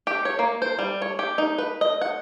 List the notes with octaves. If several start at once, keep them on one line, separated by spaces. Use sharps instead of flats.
G4
C#5
A#3
C5
G3
C#5
G4
D#4
B4
D#5
F#5